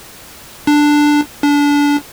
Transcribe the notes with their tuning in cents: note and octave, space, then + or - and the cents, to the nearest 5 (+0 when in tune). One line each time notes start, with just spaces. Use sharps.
D4 +5
D4 -25